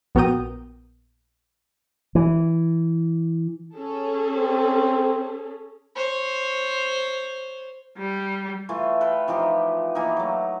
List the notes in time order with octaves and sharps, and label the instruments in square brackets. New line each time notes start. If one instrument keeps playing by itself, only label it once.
[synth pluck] A#1 B3 F#4 A#4 G5 D#6
[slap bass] E3
[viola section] C#4 G#4 A4
[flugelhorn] C4
[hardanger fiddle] C5 C#5
[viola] G3
[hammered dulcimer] E3 A3 F4
A4 B4 F5 G5
E3 F3 D#4 G4
E3 A#3 D#4
F#3 A3